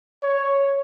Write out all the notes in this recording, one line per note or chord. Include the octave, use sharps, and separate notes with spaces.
C#5